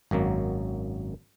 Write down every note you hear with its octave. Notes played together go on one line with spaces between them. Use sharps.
G#1 F#2 F#3 A#3